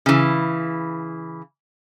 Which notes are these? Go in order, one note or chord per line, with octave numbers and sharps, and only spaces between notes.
C#3 E3